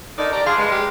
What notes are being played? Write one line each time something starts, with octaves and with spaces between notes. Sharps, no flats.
D3 D#3 D#4 D5
G4 D5 A#5
D4 G#4 F5 C6 F6
G#3 B4
G4